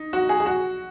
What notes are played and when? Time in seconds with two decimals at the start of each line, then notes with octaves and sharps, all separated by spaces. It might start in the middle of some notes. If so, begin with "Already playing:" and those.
Already playing: D#4
0.13 F#4
0.29 G#4
0.40 G#4
0.46 F#4